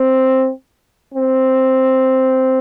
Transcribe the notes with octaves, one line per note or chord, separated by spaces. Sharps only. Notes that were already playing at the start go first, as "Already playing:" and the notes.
Already playing: C4
C4